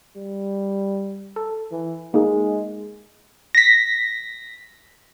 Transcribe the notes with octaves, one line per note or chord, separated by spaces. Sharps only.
G3
A4
E3
G#3 A#3 D#4 G#4
A#6 B6